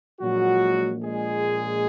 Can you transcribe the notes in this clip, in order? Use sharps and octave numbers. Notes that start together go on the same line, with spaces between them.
A#1 A#2 F#3 G#3 F#4
G#3 G#4